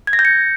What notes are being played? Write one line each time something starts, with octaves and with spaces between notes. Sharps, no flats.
G#6
A#6
G6
C#7